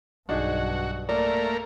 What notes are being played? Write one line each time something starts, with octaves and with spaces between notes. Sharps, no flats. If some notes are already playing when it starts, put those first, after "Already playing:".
B1 G2 D4 D#4 F#4 G#4
A3 A#3 A#4 D5